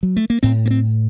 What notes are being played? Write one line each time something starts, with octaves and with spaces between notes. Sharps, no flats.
F#3
A3
A#3
A2 C4
A#3
C4